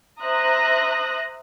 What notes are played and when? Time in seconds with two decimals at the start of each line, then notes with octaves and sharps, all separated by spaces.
0.21 C5 E5 A#5 D#6 F#6 A#6